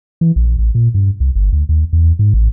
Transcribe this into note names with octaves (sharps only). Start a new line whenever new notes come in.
E3
A#1
A1
A#2
G2
C2
G1
D2
D#2
E2
G#2
A1